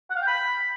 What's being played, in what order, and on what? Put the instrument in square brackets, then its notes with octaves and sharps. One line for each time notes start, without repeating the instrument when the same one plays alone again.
[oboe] F#5
F5
G5
B5